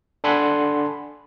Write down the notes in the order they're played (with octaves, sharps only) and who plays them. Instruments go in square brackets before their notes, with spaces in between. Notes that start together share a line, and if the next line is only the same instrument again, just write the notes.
[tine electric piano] D4 A4 F#5 G#5 B5 C6